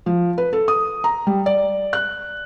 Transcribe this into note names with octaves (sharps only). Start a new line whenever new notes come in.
F3
B4
A4
D#6
A#5
G3
D5
F#6